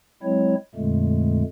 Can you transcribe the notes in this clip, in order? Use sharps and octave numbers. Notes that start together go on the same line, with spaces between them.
F#3 G#3 C4 E4 C#5
F2 A#2 D3 G#3 A3